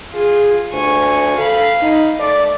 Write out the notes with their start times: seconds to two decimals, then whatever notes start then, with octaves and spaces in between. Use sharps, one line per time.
0.14 F4 G#4
0.73 D2 G#5 C#6
1.38 A4 F5 B5
1.82 D#4
2.19 A3 D5